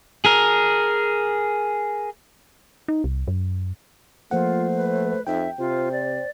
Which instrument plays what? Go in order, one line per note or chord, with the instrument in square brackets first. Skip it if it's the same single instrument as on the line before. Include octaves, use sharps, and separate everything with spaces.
[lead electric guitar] G#4 A#4
[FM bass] D#4
C2
F#2
[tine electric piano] F3 A#3 F#5 [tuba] A3 [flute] F4 [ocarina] C5
[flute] B4
[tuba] F2 [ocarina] D#4 [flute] E5 [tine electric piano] G5
[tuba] C3 [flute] F4 [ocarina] C5
[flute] D5